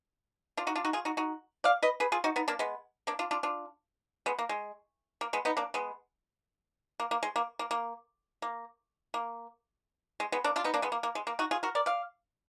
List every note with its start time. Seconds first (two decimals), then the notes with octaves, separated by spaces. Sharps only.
0.57 D4 F4
0.67 D#4 F#4
0.76 D4 F4
0.85 D#4 F#4
0.93 F4 G#4
1.05 D#4 F#4
1.17 D#4 F#4
1.64 D5 F5
1.82 B4 D#5
2.00 G#4 B4
2.12 F4 G#4
2.24 D#4 F#4
2.36 B3 D#4
2.48 A#3 D4
2.59 G#3 B3
3.07 A#3 D4
3.19 D4 F4
3.31 D4 F4
3.43 D4 F4
4.26 G#3 B3
4.39 A#3
4.49 G#3
5.21 A#3
5.33 G#3 B3
5.45 B3 D#4
5.57 A#3 D4
5.74 G#3 B3
7.00 A#3
7.11 A#3
7.23 G#3
7.36 A#3
7.59 A#3
7.71 A#3
8.42 A#3
9.14 A#3
10.20 G#3
10.32 G#3 B3
10.44 A#3 D4
10.56 D4 F4
10.64 B3 D#4
10.74 A#3 D4
10.82 G#3 B3
10.92 A#3
11.03 A#3
11.15 G#3
11.27 A#3
11.39 D#4 F#4
11.51 F4 G#4
11.63 F#4 A#4
11.75 A#4 D5
11.86 D5 F5